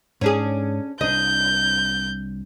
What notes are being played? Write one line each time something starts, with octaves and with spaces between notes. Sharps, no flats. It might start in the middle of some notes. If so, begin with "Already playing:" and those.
G#2 C#4 D4 G#4
C2 D4 D#5 G6